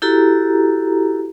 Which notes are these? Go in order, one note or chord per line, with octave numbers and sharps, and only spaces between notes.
E4 F#4 G4 A4 A#5